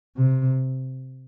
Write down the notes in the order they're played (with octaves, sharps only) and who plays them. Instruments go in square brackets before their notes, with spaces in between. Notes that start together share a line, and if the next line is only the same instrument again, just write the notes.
[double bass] C3